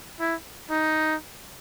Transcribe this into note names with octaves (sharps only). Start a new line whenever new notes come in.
E4
D#4